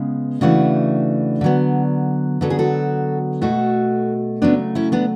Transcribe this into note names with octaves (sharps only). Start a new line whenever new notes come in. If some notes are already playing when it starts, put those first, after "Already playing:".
Already playing: C#3 G#3 B3
C#3 E3 A3 D4 F#4
D3 F#3 B3
D3 F#3 B3 A4
G#4
F#4 A4
B2 A3 F#4 A4
C#3 F#3 A3 B3 D4
C#4 E4
B3 D4